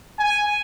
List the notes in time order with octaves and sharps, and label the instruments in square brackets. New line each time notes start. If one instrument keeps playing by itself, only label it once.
[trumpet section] G#5